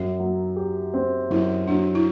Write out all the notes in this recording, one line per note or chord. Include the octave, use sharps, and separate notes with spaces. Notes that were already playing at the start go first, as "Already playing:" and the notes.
Already playing: F#2 F#4
F#3
G4
C4
F#2 E4
F#3 D4
E4